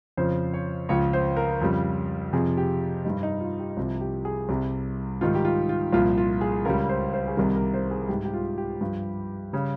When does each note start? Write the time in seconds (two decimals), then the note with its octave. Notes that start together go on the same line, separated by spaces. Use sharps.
0.17 F2 C#3 F3 C5
0.54 C#5
0.89 C#2 C#3 F3 C#5
1.13 C5
1.37 A#4
1.61 F2 C#3 G3
2.33 F2 C3 F3 G#4
2.57 G4
3.05 G2 G3 D#4
3.23 D#4
3.41 F4
3.59 G4
3.77 C2 C3 F3 F4
4.01 G4
4.25 G#4
4.49 C2 C3 G3
5.21 G#2 D#3 G3 F4
5.35 G4
5.45 F4
5.69 F4
5.93 C2 A#2 F3 F4
6.18 F4
6.41 G#4
6.65 C#2 C#3 G3 A#4
6.89 C5
7.14 C5
7.28 G#4
7.37 C2 C3 D#3 G3 A#4
7.55 A#4
7.74 C5
7.91 G#4
8.09 G#2 G3 G4
8.25 G4
8.34 F4
8.58 G4
8.81 G2 F3
9.53 C#3 G3